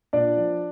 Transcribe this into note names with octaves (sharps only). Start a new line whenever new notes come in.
A#2 D4 D5
F3